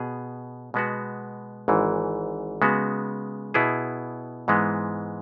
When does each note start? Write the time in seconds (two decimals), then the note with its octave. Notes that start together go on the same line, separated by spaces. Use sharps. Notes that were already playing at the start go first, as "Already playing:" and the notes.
Already playing: B2 B3 G#4
0.74 B2 G#3 B3 F#4
1.68 G#1 G#2 E3
2.62 C#3 G#3 B3 F#4
3.54 B2 B3 E4 G#4
4.48 G#2 E3 G#3 B3